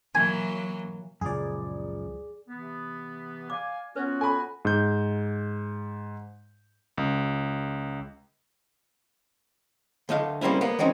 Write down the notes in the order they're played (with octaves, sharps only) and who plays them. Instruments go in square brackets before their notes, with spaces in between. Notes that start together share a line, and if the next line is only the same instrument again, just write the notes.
[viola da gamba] E3 F#3 A#3 [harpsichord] G#5
[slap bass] C#2 A#2 [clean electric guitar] F#2 F3 [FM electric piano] G#4 D5
[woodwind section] C3 E3 B3
[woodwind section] D5 F5 G#5 [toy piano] D6
[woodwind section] B3 F4 F#4 [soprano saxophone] C#4 [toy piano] B4
[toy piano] A4 [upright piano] G#5 B5
[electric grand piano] G#2 G6
C#2
[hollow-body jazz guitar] D2 A3 D#5 F5
G3 A#3 C4 C#4 E4
A#3 B3
E3 G#3 C4 C#4 D#4